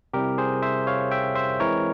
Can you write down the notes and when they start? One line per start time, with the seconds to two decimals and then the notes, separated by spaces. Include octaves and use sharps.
0.13 C3 G3 C4 E4 G4 A#4
0.38 G#4 C5
0.62 C5 E5
0.87 C#5 F5
1.11 E5 G5
1.36 C5 E5
1.60 E3 G#3 C4 E4 A#4 C#5